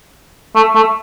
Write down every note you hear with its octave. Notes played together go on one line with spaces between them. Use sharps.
A3
A3